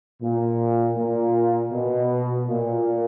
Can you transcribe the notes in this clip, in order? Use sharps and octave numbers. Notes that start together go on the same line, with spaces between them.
A#2
A#2
B2
A#2